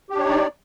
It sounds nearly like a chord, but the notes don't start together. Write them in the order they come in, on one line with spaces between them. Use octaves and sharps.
G4 D4 C#5 D#4 D5